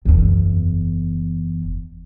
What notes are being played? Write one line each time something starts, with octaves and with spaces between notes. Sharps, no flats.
F#1 E2